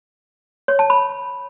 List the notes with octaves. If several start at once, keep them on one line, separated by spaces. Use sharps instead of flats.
C#5
A5
B5